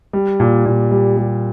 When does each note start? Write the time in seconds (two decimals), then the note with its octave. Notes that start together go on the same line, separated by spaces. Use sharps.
0.13 G3
0.40 A#2
0.66 A#2
0.91 G3
1.17 G3